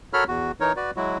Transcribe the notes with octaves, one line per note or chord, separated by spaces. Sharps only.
F#4 A4 A#4 C#5 B5 F6
E2 F#4
E3 D#4 A#4 C#5
F#4 B4 D5
F#3 G#3 E4 F#4